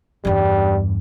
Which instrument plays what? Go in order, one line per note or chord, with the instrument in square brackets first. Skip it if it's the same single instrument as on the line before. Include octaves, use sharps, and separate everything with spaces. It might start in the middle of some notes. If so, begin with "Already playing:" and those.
[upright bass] E2 G2 [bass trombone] G3